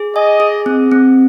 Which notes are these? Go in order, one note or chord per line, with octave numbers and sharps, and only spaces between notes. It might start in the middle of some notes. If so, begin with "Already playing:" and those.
Already playing: G#4
D#5 G#5
G#4
C4
C4